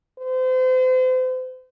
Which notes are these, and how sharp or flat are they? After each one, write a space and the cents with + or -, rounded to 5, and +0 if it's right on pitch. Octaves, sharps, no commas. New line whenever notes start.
C5 -35